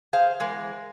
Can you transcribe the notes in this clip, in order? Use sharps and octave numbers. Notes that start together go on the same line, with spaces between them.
G#4 C5 F5
E2 G#3 A#4